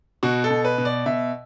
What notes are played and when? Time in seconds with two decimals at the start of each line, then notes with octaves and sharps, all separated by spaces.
0.23 B2 F#4
0.44 A4
0.50 B2
0.65 B4
0.78 B2
0.85 D5
1.06 B2 E5